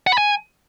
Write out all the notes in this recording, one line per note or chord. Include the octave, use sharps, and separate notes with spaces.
F#5
B5
G#5